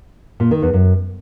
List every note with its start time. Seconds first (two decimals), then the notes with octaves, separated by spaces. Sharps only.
0.40 A#2
0.51 D#3
0.62 E2
0.73 F#2